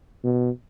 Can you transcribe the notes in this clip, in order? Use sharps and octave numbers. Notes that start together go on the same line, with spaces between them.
B2